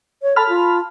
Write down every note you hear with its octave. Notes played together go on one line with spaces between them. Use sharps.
C#5
A4 A5 B5 F6
F4